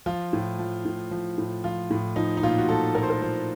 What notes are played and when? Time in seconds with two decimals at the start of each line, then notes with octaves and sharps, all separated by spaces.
0.06 F3 F4
0.33 A2
0.59 F3
0.85 A2
1.11 F3
1.38 A2
1.64 F3 F4
1.90 A2
2.16 F3 D#4
2.37 D#4
2.43 A#2 F4
2.58 F#4
2.69 F3 A4
2.95 A#2 A#4
3.03 C5
3.10 A#4
3.22 F3 C5